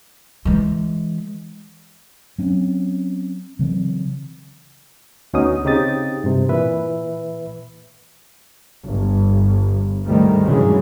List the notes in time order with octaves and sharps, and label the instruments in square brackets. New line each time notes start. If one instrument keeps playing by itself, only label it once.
[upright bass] E3 G#3
[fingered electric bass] F#3 C4 C#4
C#3 E3 F#3 C4
[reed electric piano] D2 B3 C#4 D#4 F#4 D#6
C#3 C4 D#4 G4 D#6 A6
G2 C3
A#2 E3 B4 E5
[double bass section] G1
D2 G#2 D#3 G3 A3
G2 C#3 E3 F#3 G#3